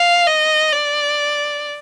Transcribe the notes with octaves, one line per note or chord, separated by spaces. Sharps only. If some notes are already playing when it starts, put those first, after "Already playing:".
Already playing: F5
D#5
D5